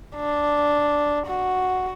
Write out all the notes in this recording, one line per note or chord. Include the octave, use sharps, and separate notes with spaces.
D4
F#4